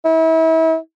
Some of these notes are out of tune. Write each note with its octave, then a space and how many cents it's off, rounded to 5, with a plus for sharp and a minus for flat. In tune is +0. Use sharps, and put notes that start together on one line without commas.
E4 -35